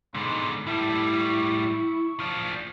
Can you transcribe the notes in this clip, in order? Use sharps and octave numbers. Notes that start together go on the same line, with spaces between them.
G#2 B2 D3 C6
A2 G3 E4 A4
C#6
F3 D4